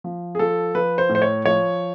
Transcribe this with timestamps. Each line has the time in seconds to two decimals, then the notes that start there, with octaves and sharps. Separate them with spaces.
0.04 F3
0.35 G#4
0.39 F3 A4
0.74 F3 B4
0.98 C5
1.09 A2
1.15 C5
1.22 C#5
1.45 F3 C#5